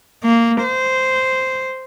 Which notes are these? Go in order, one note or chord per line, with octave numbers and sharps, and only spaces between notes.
A#3
C5